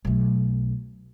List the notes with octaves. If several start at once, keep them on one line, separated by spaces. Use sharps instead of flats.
B1 A3